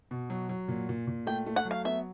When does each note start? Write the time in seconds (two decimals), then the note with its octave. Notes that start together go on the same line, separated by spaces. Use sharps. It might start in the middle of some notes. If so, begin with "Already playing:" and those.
0.11 B2
0.30 F#3
0.49 F#3
0.68 A#2
0.89 A#2
1.07 A#2
1.27 A3 G5
1.46 A3
1.56 F#5
1.65 F#3
1.71 F5
1.85 B3 E5